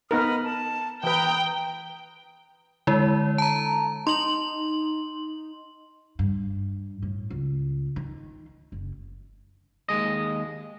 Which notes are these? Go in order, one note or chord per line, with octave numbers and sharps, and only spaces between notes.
B3 D#4 A#4 B4 D#6 F6
A5
E3 B4 G5 A#5 D#6
D3 G#3 E4
A5 A#5
D#4 C6 F#7
G2
A2
C#2
D#3
F#1
D#2 C3 G#3 D#5